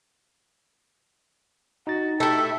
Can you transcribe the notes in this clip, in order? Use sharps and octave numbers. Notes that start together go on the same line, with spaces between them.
D#4 F#4 A6
A3 E4 G4 A4